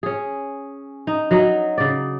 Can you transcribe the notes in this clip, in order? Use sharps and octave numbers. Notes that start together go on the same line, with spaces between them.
C#4 G#4
D#4
F#3 D#4 F#4
C#3 D5